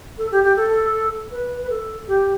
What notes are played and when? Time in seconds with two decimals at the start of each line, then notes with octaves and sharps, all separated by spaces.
0.18 A4
0.32 G4
0.44 G4
0.56 A4
1.31 B4
1.62 B4
1.70 A4
2.08 G4